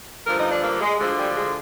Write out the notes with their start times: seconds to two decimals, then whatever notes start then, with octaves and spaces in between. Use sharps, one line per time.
0.25 G2 D3 F3 A#4
0.38 D#4
0.50 D4
0.63 A#3
0.81 G#3
0.98 D2 D3 F3 G#3
1.17 G3
1.35 G#3